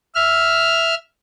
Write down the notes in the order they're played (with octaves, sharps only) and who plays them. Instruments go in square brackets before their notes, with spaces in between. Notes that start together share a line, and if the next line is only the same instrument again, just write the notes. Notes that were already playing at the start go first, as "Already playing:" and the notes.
[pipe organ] E5 F6